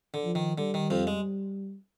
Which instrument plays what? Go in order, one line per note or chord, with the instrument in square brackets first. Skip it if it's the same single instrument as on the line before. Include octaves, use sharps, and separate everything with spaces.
[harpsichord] D3
[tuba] F3
[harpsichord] D#3
[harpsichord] D3 [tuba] G3
[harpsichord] D#3
F2 F3
G#3